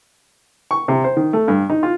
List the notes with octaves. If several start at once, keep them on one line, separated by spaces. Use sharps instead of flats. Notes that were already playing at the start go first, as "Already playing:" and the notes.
C#6
C3
C5
D#3
A3
G2
D#4
F4